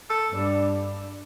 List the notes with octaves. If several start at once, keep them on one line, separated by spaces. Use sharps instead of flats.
A4
G2 G3 D4